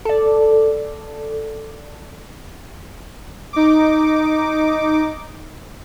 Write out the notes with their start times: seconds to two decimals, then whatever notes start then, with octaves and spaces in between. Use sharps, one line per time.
0.05 A4 D5
3.53 D#4 D6